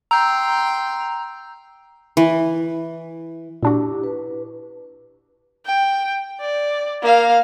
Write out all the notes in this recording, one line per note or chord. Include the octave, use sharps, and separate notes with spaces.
G5 A#5 C6 E6 G6
E3
A#2 D4 E4 F#4 G4 D6
B4
G5
D5
A#3 F5